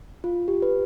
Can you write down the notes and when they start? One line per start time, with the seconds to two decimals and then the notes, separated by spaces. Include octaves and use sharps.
0.24 F4
0.48 G4
0.62 B4